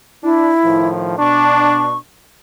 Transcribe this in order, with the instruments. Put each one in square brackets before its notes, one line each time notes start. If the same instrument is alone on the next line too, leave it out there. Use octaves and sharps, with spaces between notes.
[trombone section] D4 [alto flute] E4
[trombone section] A2 D#3 F3
[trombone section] B2 D4 [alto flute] C#6